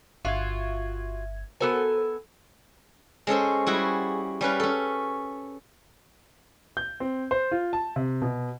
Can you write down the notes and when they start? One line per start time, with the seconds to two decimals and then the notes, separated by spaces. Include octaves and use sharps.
0.25 G1 F4 F#4 E5 G#6
1.61 B3 F#4 A4 A#4 C5 G#5
3.27 G#3 C#4 A4 C5
3.67 G3 E4 F#4 G#4
4.41 G3 C#4 B4 F5
4.60 C#4 A4
6.77 G6
7.00 C4
7.31 C5
7.52 F4
7.73 A5
7.96 C3
8.22 B2